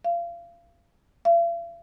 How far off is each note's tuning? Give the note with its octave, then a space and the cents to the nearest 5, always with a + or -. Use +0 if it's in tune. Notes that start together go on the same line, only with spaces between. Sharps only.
F5 -30
F5 -45